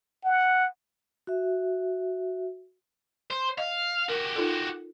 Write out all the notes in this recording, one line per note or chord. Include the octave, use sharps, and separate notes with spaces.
F#5
F#4 E5
C5
D#5 F5
F#4 G4 A#4
D#4 F4 A4